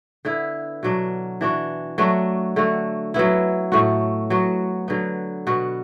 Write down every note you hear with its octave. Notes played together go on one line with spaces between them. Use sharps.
D3 B3 E4
B2 F#3 D4
E3 D4 F#4
F#3 A3 D4 F#4
D3 A3 F#4
F#3 B3 E4
A2 A3 F#4
F#3 B3 F#4
D3 F#3 B3
B2 B3 F#4